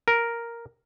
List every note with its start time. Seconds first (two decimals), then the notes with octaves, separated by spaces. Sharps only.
0.08 A#4